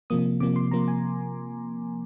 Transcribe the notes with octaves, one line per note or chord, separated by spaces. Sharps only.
C3 F3 A#3 D#6
C3 F3 A#3 D6
C6
C3 F3 A#3 A#5
G#5